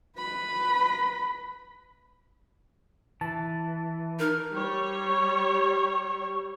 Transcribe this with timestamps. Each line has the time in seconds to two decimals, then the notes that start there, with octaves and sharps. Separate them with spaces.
0.18 B4 B5
3.21 E3 A5
4.20 D#4 A#4
4.52 G3 C#5